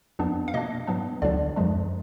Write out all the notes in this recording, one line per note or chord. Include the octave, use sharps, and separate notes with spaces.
F2 F3 B3 D4
F5
B2 A#3 D4 D#5
G#2 F#3 B3 D4
D2 D3 F#3 D4 D5
F#2 F3 G#3 D4